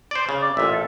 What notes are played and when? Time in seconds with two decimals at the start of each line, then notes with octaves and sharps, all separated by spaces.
0.11 C5 D5
0.29 C#3
0.42 D5
0.57 A1 A#2 E5
0.73 A4